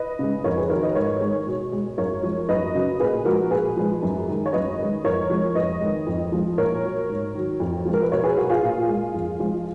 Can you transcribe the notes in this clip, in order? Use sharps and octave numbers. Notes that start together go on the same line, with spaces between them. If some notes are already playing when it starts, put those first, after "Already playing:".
Already playing: B4 D#5
C#3 G#3
F2 A#4 C#5
G#4 B4
D#3 F#3 A#4 C#5
B4 D#5
G#2 A#4 C#5
D#3 G#3
B2
G#3
F#2 A#4 C#5
F3 G#3
F#2 B4 D#5
C#3 F#3
A#2 G#4 B4
F3 G#3 F#4 A#4
A#2 G#4 B4
F3 G#3
F#2
D#3 G#3
C#5
F#2 B4 D#5
D#3 G#3
F2 A#4 C#5
F3 G#3
F2 B4 D#5
D#3 G#3
F2
F3 G#3
A#2 A#4 C#5
F#3
G#2
D#3 F#3
F2
F3 G#3
A#4
B4
B2 A#4 C#5
G#4 B4
F#3 F#4 A#4
F4 G#4
A#2
G#3
F2
F3 G#3